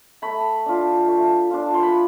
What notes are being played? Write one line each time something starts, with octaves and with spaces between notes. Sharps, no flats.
A3 B5
D4 F4
A3
D4 F4
C6
B5